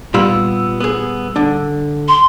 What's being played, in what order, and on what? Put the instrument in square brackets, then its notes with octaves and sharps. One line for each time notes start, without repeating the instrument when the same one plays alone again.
[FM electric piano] A#2 G3 E6 [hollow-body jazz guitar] B3 F4 B5
[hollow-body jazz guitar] B3 G#4
D3 D4
[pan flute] C6